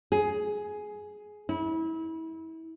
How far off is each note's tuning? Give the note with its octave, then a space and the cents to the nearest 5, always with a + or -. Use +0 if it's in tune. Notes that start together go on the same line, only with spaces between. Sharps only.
G#4 +10
E4 -30